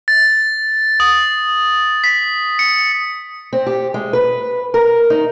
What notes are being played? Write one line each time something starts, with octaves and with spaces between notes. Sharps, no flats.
A6
D#6
B6
C#7
C4
G4
G#3
B4
A#4
D#4